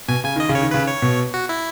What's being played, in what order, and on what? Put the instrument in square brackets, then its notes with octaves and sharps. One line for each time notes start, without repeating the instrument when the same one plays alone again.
[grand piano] B2 [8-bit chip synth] G#5
[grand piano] C#3 [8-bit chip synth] G#5
[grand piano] D#3 [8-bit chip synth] D#5
[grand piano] C#3
[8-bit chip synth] C#5
[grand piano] D#3
[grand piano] C#3 [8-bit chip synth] B4
[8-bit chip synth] C#5
[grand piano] B2
[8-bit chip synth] F#4
E4